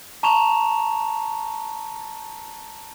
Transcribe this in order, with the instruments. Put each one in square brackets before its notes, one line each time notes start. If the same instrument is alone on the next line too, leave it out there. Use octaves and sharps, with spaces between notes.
[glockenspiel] A5 A#5 C#6 E7 F7